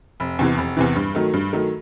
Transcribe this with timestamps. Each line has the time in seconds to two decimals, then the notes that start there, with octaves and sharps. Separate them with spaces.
0.20 F1
0.39 E2 C3 E3
0.58 F1
0.77 E2 C3 E3
0.96 G2
1.15 D#3 F#3 A3
1.33 G2
1.53 D#3 F#3 A3